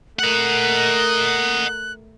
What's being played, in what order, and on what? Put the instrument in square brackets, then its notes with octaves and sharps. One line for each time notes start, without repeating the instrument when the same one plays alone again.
[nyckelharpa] A3 A#4 [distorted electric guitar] D#5 F#5 [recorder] F#6